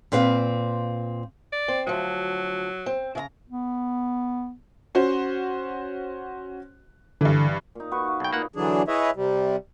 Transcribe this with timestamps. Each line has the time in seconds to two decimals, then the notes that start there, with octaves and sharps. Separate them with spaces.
0.12 A#2 C4 B4 F5
1.52 D5
1.68 C4
1.87 D2 F3 F#3
2.86 C4
3.15 C#3 E5 A#5
3.50 B3
4.95 C#4 F#4 C5
7.21 G2 D3 E3
7.75 A#2 D#4
7.91 F#4 B4 C#6
8.07 F5
8.20 B1 G5
8.33 A#2 A#3 D#4 F#5
8.56 D3 E3 F#3 D4 G#4
8.88 E4 G#4 B4 C#5 D#5 E5
9.16 C3 G3